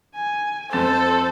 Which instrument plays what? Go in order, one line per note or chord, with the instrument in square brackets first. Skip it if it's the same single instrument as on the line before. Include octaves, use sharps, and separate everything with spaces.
[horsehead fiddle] G#5
[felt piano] F2 A6 E7 [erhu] A4 [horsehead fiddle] C5